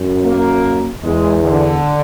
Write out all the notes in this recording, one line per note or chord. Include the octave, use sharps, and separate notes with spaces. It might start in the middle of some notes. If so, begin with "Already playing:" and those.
Already playing: F#2
A#3
E2 G#3
D3